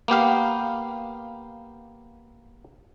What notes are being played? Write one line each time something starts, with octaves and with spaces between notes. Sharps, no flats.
A#3 B3 G4 F5